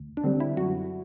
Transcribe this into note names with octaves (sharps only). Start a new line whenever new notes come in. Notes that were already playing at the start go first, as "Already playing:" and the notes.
Already playing: D2
D4
D3 G3 C4
E4
F#2 F#4